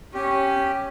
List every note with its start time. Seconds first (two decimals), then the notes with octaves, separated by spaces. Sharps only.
0.14 C#4 G4